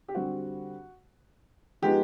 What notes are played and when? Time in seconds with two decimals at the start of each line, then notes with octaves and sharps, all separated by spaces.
0.08 G4
0.15 D3 G3 C4 F#4
1.82 F3 G#3 B3 D#4 G4